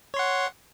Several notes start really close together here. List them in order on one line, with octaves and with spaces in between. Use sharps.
C#5 C6 F#5